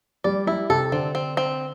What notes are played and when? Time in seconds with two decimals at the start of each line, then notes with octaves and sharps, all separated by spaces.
0.24 G3 D5
0.47 G3 E4
0.70 C3 A4
0.92 D3 C4
1.15 C4
1.37 C4